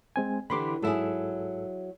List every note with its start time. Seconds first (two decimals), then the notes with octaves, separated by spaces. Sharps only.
0.16 G#3 C4 G#5
0.50 D3 E3 G4 B5 C6 D6
0.82 G#2 F#3 E4 G#4 A4 E6